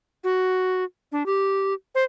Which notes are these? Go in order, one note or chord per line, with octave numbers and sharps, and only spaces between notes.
F#4
D4
G4
C5